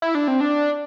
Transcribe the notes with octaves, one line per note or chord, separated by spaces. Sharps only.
E4
D4
C4
D4